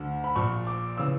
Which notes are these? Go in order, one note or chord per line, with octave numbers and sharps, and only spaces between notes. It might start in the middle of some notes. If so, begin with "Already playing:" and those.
Already playing: D2 D3
B5
A#1 A#2 C#6
D6
C#3 E3 E6